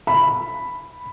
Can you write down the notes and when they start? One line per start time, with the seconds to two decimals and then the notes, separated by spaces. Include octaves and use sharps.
0.07 B5